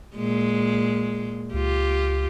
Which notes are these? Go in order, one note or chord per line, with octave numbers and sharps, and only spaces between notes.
A#2 G#3
C#2 F4 G4